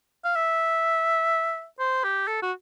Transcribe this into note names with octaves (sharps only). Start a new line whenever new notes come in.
F5
E5
C5
G4
A4
F#4